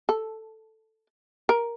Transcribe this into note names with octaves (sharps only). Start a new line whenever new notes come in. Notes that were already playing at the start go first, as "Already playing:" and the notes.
A4
A#4